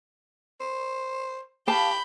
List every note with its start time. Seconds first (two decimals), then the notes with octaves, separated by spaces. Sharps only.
0.61 C5
1.68 G4 F5 A5 B5 G6